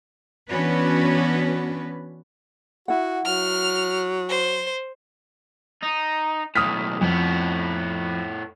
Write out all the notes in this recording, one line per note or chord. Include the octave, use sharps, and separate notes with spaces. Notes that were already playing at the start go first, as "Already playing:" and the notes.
E3 B3 C#4 D4 F#4 B4
E4 F#4 F#5
F#3 F6
C5
D#4
B1 A2 D#6 F6 B6
F2 A2 B3